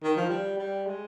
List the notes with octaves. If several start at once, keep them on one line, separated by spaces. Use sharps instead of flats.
D#3
F3
G3
G3
G#3